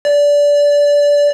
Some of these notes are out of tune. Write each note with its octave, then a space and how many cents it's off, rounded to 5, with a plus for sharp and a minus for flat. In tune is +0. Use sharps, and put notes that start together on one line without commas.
D5 -20